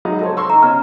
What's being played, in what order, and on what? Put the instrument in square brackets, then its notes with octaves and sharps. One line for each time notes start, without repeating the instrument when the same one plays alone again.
[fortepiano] F#3 G#3 D#4
A4 C5 C#5
C6 C#6 E6
[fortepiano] D#4 [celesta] A#5
[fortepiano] B2 C#4 [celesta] F6